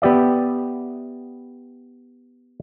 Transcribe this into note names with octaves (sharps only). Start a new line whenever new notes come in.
B3 G4 D5 E5